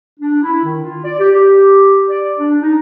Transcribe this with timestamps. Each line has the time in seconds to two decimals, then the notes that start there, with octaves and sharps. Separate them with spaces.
0.20 D4
0.42 E4
0.64 D#3
0.83 F4
1.04 D5
1.19 G4
1.34 G4
2.08 D5
2.37 D4
2.62 D#4